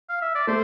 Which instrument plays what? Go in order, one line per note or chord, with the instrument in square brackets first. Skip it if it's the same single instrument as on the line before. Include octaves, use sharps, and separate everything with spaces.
[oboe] F5
E5
D5
[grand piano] A3 [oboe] C5